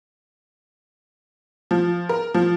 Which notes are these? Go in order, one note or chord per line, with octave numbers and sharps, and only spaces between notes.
F3
A#4
F3